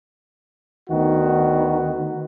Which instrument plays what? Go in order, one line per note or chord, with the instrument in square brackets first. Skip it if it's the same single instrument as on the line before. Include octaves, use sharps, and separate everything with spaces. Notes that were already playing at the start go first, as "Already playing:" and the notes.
[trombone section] D2 D#3 B3 F#4